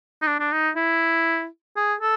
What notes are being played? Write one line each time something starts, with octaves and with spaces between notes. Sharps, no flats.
D#4
D4
D4
D#4
E4
G#4
A4